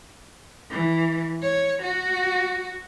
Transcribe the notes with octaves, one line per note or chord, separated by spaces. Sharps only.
E3
C#5
F#4